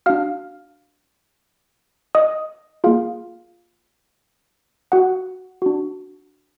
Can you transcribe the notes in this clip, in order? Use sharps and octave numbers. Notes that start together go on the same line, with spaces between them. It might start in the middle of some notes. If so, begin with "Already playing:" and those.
D4 F#4 F5 F6
D#5 D#6
A#3 F4 G#4 F5
F#4 F#5
D4 F#4